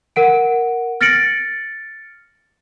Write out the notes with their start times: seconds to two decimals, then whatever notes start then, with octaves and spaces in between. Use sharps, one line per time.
0.16 A#4 F#5 D7
1.01 F6 A6 A#6 C#7 D7 F#7